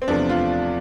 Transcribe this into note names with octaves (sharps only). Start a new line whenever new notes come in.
C4
E2 C3 F3 A3 D4
F4